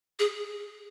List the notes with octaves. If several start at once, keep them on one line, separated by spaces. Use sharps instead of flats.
G#4